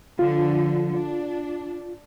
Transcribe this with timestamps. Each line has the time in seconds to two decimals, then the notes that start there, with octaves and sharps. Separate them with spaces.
0.19 D3 F3 F4
0.95 D4